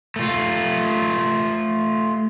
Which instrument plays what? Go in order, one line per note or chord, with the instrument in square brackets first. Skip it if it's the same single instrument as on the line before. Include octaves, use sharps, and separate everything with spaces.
[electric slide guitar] A3 F4